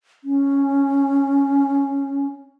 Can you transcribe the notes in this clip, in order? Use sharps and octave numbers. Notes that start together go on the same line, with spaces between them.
C#4